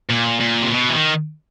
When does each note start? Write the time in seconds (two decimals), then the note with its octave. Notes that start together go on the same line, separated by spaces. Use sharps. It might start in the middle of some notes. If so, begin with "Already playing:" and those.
0.10 A#2
0.41 A#2
0.62 C3
0.71 B2
0.89 E3
0.94 D#3